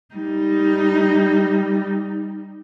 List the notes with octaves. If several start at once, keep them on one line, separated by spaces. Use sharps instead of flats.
G3 D#4